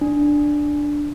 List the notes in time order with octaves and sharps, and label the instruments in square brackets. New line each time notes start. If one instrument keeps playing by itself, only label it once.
[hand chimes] D4